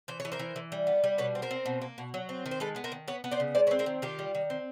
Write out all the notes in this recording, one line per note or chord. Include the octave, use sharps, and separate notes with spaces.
E3 C5
C#5
E3
A#4 C5
E3
E3
G3
B3
G3
B2 B4 C#5
C4
A#4 C5
C4
B2
A#3
B2
F#3
C4
D#3
C5
G#3 A4 B4
B3
A#4 C5
D#3
B3 B4 C#5
B3
C5 D5
C#3
G#3 C5 D5
B4 C#5
C4
A#4 C5
D#3
D#3 F4 G4
G3
D#3
C4